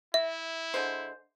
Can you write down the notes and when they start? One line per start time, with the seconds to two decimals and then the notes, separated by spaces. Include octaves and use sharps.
0.14 E4 E5
0.74 D3 G#3 C5